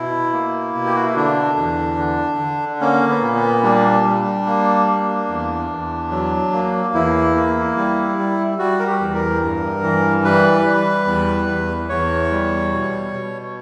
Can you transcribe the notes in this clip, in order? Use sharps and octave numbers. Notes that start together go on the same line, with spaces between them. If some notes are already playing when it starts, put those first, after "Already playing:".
Already playing: B2 E4
A#3
B2
G4
F#4
E4
D3 D4
E2
D3
D3
A#3 C#4
B3
A#2
B3
G3 D4
G3
A#3
A#3
E2
E2
F#3
A#3
E2 E4
A#3
G3
G3
G3 F#4
A#4
G4
E2
A#4
G2
E3
G3 B4
G3
E2
E2
E2 C#5
G3
B2
B2